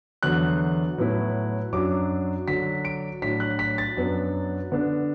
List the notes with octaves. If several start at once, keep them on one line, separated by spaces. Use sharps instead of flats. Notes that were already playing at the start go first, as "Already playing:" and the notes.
E2 D3 F#3 F#6
A2 F#3 B3 E4
F#2 F#3 D4 D6
D3 F#3 D4 B6
D7
A2 F#3 D4 B6
F#6
B6
A6
F#2 F#3 B3 D4
D3 B3 D4